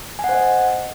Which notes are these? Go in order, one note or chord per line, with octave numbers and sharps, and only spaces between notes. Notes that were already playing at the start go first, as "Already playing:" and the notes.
G#5
F#5
C5
D#5